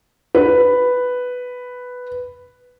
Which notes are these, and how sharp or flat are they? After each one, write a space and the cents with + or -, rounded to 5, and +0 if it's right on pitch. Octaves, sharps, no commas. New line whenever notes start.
B4 +5